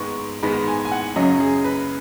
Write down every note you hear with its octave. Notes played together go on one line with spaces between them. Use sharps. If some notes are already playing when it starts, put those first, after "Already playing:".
Already playing: G#2 D#3 G#3 B3 C#6
G#2 D#3 G#3 B3 B5
G#5
G#5
F#5
F#2 C#3 F#3 C#4 D#5
G#4
B4